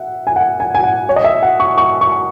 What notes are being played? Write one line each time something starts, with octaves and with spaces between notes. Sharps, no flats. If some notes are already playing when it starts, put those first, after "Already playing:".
Already playing: E5 F#5
G#5
F#5
G#5
G#5
F#5
C#5
D#5
E5
F#5
C#6
C#6
C#6